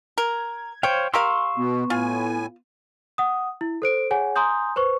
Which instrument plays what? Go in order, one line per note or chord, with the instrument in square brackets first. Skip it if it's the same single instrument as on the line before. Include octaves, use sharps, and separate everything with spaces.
[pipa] A#4 [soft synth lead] G#6
[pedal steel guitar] C5 C#5 F5 [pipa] G5
[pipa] G4 A#4 F5 [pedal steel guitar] C6 C#6 E6
[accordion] B2 [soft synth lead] B3
[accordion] A2 G#5 [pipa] F4
[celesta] F#5 D#6
E4
A4 C5 D7
G#4 C#5 F#5 G#5
G#5 A#5 C6 D#6 G6
B4 C5 C#6